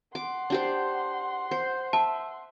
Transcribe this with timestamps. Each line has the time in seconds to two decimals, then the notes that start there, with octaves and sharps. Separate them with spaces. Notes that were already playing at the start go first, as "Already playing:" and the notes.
0.15 F#5 C6 D6
0.50 D4 G4 C5
1.51 C5
1.93 E5 A5